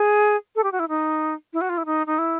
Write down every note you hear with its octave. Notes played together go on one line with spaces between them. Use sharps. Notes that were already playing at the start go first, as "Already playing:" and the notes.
Already playing: G#4
A4
G4
F#4
E4
D#4
E4
F#4
F4
E4
D#4
D#4
E4